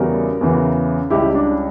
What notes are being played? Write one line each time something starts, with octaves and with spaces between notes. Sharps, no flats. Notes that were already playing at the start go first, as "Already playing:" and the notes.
Already playing: E2 C#3 E3 G3 F#4 A#4
E2 C#3 E3
C#2 C#3 G3 E4 G4
D4